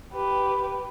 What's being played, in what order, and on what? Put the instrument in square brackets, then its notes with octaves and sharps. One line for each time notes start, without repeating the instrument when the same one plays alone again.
[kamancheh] G4 B4